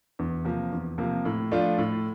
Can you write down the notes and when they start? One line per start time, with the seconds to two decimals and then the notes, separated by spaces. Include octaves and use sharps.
0.19 E2
0.45 C3 F3 A#3
0.72 E2
0.98 C3 F3 A#3
1.25 A2
1.52 F3 A3 D4 F4
1.78 A2